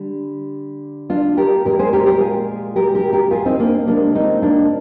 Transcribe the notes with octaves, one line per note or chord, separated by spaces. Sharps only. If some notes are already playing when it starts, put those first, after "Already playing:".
Already playing: D3 G3
D4 F4
G4 A#4
A#2 F3 G#3 G4 A#4
G#4 C5
G4 A#4
G4 A#4
F4 G#4
G4 A#4
G4 A#4
G4 A#4
F4 G#4
C4 D#4
A#3 D4
C3 F3 G#3 A#3 D4
C4 D#4
A#3 D4